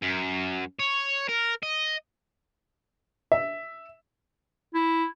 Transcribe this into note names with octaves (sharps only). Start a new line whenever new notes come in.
F#2
C#5
A#4
D#5
E5
E4